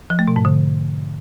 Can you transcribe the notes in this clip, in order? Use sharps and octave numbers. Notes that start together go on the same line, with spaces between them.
F3
A3
B2
G#2
D3